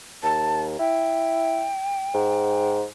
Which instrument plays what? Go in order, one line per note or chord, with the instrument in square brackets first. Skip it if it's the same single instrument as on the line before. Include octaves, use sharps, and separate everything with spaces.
[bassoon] D#2 [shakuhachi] A5
[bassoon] E4 [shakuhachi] G5
[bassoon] G#2